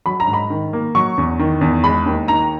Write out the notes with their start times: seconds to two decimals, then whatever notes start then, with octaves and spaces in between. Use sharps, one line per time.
0.06 F#3 B5
0.20 A#5
0.28 G#2
0.33 B5
0.50 D#3
0.73 A#3
0.95 F#3 C#6
1.18 E2
1.39 D#3
1.61 E2
1.84 G#3 B5
2.06 D#2
2.28 D#3 A#5